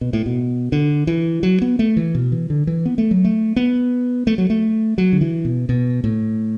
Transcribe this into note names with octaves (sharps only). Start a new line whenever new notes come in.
B2
A2
B2
D3
E3
F#3
B3
A3
E3
B2
E3
D3
E3
B3
A3
F#3
A3
B3
A3
F#3
A3
F#3
D3
E3
B2
B2
A2